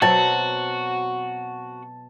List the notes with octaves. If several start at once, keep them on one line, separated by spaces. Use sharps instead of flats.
B2 F#3 C4 F#4 A5